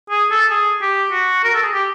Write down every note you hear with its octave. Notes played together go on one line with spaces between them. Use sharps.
G#4
A4
G#4
G4
F#4
A#4
A4
G#4
G4